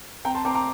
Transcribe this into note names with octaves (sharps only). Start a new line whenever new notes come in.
C4 G5 A#5
A5 C6
C4 A#5 D6
A#5 D6